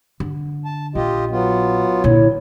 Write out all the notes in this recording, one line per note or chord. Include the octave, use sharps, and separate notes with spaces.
D3
A5
A#1 F4 G4 D#5
F#3 B3 F4
A#2 D3 E4 C#5